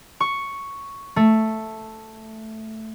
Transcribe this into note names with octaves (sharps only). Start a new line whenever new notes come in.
C#6
A3